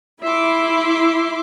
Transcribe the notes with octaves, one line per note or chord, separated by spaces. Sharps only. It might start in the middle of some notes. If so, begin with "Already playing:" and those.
E4 E5 C6 D6